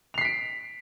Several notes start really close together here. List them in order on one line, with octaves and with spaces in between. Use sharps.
F7 C7 B6 D7